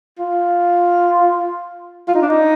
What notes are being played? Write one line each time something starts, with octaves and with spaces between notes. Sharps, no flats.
F4
F4
D#4
D4
D#4